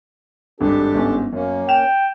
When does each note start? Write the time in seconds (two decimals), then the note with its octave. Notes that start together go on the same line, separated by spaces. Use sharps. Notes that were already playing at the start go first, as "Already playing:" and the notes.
0.60 G#1 G2 D4 G4 A4
0.94 G1 G#2 C#4
1.33 F#2 A#3 C#4
1.69 G5 E7 F7